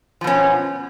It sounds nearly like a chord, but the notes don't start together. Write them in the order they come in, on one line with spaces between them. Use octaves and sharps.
F3 B2 C#4